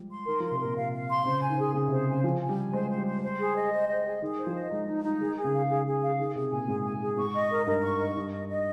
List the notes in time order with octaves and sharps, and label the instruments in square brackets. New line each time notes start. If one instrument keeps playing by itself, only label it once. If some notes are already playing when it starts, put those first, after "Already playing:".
Already playing: [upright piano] F3 G3 G#3
[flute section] C6
[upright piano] D#3 [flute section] A#4
[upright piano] F3 [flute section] C6
[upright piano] C3
[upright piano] A#2 [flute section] A#4
[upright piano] C3 [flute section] F5
[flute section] F5
C6
[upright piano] C#3 [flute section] C5
[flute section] G#5
[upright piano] D#3
[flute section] G#4
[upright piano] C#3 [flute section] G#4
[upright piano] C3 [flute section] C5
[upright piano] C#3 [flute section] G#5
[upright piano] F3 [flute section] G#5
[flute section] G#5
[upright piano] G3
[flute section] G#5
[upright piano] G#3 [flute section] C5
[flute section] C5
[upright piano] G3
[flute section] C5
C5
G#4
D#5
C5
D#5
G#4
[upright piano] D#3 [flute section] G#4
[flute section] C5
[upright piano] F3
[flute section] D#5
[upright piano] G#3 [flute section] D#4
[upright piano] G#3 [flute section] D#4
[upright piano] G3 [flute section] D#4
[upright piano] D#3 [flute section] G#4
[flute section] G#4
[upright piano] C#3
[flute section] F5
[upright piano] D#3 [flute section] G#4
[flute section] G#4
F5
[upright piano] D#3 [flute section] G#4
[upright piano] C3 [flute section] G#4
[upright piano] A#2 [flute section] G#5
[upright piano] G#2 [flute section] G#4
[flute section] G#5
G#4
[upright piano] G#2 [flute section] C#6
[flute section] D#5
A#4
[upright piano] G2 [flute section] A#4
[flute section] C#6
D#5
[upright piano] G2 [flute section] D#5
[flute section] D#5
D#5